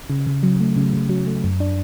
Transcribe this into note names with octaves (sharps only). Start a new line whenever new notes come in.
C#3
C#3
F#3
A3
C#3
C#3
F#3
A3
F#2
D4